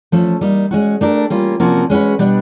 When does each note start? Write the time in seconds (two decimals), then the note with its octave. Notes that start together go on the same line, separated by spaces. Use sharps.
0.12 F3 A3 C#4
0.41 G3 A#3 D#4
0.71 G#3 C#4 F#4
1.01 A3 D4 G4 A#4
1.30 G3 A#3 C#4 F4
1.60 C3 F3 A#3 C#4 F#4
1.90 G#3 C#4 F#4 B4
2.19 B2 G3 B3 D4